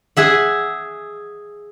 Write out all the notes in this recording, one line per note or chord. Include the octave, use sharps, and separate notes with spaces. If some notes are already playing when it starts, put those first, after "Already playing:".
G#4 E5 F#5